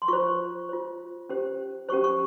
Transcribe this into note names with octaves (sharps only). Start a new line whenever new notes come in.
C6
F4 C5 C#6
F4 C5
C#4 G4 C5
C#4 G4 C5 C#6
C#6